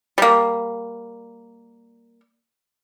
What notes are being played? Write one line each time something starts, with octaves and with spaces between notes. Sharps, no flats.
G3 A#3